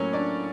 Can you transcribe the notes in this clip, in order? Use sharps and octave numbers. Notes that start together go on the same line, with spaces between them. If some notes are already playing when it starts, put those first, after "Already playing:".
Already playing: A2 F#3 A#3 C#4 C#5
D4 D5